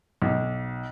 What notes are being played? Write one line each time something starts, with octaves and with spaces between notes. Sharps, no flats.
B1